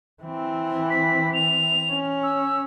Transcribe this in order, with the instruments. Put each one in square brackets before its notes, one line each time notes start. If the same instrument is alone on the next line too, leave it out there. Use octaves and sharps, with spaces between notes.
[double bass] E3 C4
[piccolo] B6
F7
[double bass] C#4
[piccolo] E6